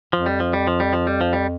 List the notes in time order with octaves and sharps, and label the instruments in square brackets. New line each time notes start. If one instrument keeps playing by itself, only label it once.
[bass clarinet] F2 [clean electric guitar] F3
[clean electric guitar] G3
F3
G3
F3
G3
F3
G3
F3
G3